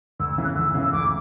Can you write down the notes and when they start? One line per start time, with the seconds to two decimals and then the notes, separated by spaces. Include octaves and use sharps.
0.19 D2 E6
0.32 E6
0.38 C#3 E3
0.44 F#6
0.56 D2 E6
0.74 C#3 E3
0.82 E6
0.92 D2 D6